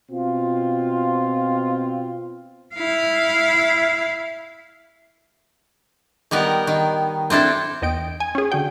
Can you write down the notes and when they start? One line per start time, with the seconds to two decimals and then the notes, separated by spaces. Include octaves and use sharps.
0.11 B2 C4 F4
2.75 E4 F5
6.31 D#3 G3 B3 A#4
6.67 D#3
7.30 C4 D4 E4 A4
7.82 E2 D#5 G5 D7
8.20 G#5
8.35 C#4 G#4
8.52 D3 F#4 G5